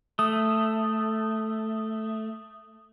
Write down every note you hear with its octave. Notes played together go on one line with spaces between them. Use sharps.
A3 D#6